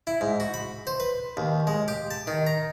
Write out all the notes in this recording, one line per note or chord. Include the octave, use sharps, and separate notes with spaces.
E4
G#2
F#4
B5
C5
B4
D#2
G#3
G4
A5
D#3
A#5